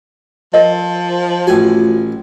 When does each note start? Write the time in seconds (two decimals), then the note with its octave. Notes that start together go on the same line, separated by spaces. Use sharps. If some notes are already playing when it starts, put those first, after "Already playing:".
0.54 F3 A#4 D#5
1.47 A1 F4 F#4 G#5